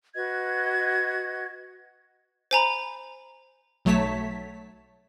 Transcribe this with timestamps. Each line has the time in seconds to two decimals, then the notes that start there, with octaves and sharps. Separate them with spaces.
0.15 F#4 B4 D#5 G#6
2.51 C5 G#5 A#5 B5
3.85 B1 F#3 A3 C#5 A5 B6